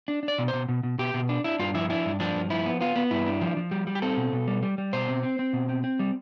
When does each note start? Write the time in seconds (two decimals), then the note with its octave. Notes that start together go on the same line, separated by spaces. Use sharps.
0.08 D4
0.23 D4
0.28 D5
0.38 B2
0.48 C5
0.53 B2
0.69 B2
0.83 B2
0.98 B2 G4
1.14 B2
1.29 D4
1.44 D4 E4
1.59 G2 F4
1.74 F3 E4
1.90 D4 E4
2.05 G2
2.20 F3 D4
2.35 G2
2.50 F3 E4
2.66 B3
2.81 B3 F4
2.96 B3
3.11 G2 E4
3.26 D4
3.41 F3
3.57 F3
3.71 G3
3.87 G3
3.95 G4
4.02 C4 A4
4.17 B2
4.32 B2
4.48 G3
4.63 G3
4.78 G3
4.93 B2 C5
5.08 C4
5.23 C4
5.39 C4
5.53 B2
5.69 C4
5.84 C4
5.99 G3